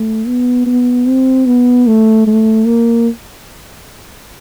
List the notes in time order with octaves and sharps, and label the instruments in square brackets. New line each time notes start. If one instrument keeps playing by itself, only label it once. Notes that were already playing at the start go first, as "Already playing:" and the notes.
Already playing: [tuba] A3
B3
B3
C4
B3
A3
A3
A#3